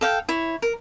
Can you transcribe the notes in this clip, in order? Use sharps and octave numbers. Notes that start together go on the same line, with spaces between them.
A4 F5 G5
E4 C#5
A#4